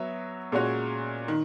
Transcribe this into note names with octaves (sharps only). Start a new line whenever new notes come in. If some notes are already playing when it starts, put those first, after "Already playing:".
Already playing: F#3 B3 F#4 C#5 E5
A#2 G#3 C#4 F#4 C#5
D#3